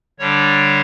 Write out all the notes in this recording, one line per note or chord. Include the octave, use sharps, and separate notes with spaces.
D3 G3 D4 C#5